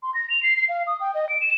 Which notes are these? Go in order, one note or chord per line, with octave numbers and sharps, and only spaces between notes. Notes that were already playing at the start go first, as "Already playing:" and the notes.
C6
A#6
F7
C7
C7
F5
D#6
G5
D#5
D7
E7